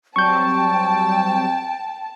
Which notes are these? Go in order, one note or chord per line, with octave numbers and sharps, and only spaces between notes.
F#3 G3 C4 G5 A5 C#6 G6